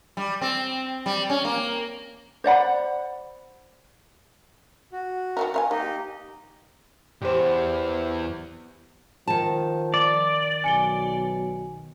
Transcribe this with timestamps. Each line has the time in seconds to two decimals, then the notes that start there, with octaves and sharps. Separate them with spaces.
0.17 G3
0.42 C4
1.06 G3
1.30 C#4
1.45 A#3
2.44 C5 D5 F#5 B5
4.92 F#4
5.37 D#3 G3 A#4
5.54 A#4 F5 G#5
5.71 A#3 D#4 G4 D#5
7.22 E2 G4 C5
9.28 D#3 F3 A5
9.94 D5
10.64 B1 G#5 C#7 G7